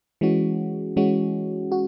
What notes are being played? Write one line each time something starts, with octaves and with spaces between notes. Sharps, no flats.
E3 G#3 C#4 F#4
E3 G#3 C#4 F#4
F#4